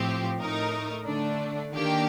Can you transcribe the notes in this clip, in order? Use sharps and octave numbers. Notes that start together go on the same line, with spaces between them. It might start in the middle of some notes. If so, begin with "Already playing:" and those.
Already playing: A2 F3 C4 G4
A2 A3 D#4 A#4
D3 A3 D4
D#3 A#3 D4 G4